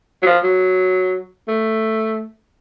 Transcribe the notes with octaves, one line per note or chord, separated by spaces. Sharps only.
F#3
F3
F#3
A3